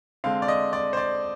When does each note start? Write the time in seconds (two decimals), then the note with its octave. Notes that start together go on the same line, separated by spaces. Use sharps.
0.24 D3 G#3 C4 F5
0.42 D5
0.48 D#5
0.73 D5
0.93 C5
0.97 D5